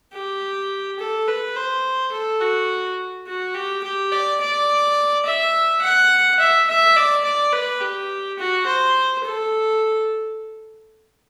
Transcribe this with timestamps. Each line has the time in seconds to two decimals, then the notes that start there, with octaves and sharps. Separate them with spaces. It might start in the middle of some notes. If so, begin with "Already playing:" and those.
0.13 G4
1.00 A4
1.28 B4
1.56 C5
2.12 A4
2.41 F#4
3.27 F#4
3.54 G4
3.84 G4
4.12 D5
4.41 D5
5.25 E5
5.82 F#5
6.40 E5
6.68 E5
6.96 D5
7.24 D5
7.53 B4
7.81 G4
8.39 F#4
8.66 C5
9.24 A4